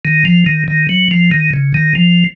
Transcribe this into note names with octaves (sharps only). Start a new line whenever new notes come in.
D#3
F3
D#3
D#3
F#3
F3
D#3
C#3
D#3
F3